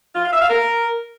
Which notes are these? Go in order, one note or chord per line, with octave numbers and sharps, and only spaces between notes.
F4
F5
E5
F5
A#4